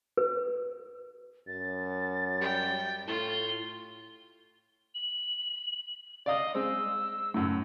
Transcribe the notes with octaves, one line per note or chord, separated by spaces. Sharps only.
B4
F#2 A6
G3 G5
A2 F4 G7
F#7
D5 D#5 F5 D#6
G#3 C4 E6
F#2 A2